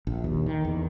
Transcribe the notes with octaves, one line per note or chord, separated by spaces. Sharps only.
A#1
D#2
D#3
E2